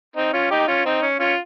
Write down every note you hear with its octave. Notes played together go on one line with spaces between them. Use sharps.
C4 D#4
C#4 F4
D#4 G4
C#4 F4
C4 D#4
C#4
C#4 F4